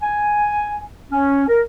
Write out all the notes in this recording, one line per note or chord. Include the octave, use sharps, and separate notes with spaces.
G#5
C#4
A#4